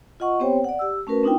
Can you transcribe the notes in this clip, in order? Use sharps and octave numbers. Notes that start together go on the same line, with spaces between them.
F4 D#5 F#5 C#6
B3 C4 G4 C5 C#5 G5
D5 F#5
G4 E6
A3 C#4 F#4 A#4 B4
C4 D4 D#4 F4 G5